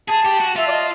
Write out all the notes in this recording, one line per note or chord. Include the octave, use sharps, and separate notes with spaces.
G#4 A5
G4
F#4
F4 E5
D5
D#5